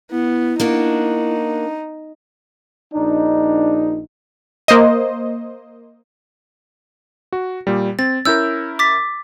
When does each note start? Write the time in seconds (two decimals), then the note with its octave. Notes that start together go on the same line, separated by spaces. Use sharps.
0.11 B3 E4
0.60 A#3 D4 D#4 F#4
2.94 A#1 D4 D#4
4.68 A#3 C5 D#5
7.33 F#4
7.67 A#2 G3
7.99 C4 A6
8.25 C#4 E4 A#4 E6 G6
8.79 D6 A6 B6